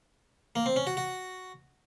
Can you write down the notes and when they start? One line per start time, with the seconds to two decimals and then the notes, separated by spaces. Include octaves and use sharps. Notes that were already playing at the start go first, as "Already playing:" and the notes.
0.56 A#3
0.66 C4
0.76 C#4
0.87 F#4
0.97 F#4